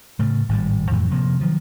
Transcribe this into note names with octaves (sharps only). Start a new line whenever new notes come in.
A2 C#3 A3
G#1 A2 C3 G3
F2 A2 E3
C3 F3 A#3
D#3 F3 F#3